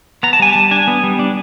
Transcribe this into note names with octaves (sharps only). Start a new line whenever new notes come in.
B3 A#5
A5
G3 G#5
G3 A5
D4 G#5
B3
G3
D4